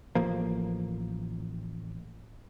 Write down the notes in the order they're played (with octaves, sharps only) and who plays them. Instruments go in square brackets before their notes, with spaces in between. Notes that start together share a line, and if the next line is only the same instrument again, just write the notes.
[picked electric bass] A1 F3 A#3